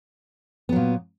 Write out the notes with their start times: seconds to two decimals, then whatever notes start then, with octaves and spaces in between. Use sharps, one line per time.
0.69 B3
0.72 F#3
0.76 A#2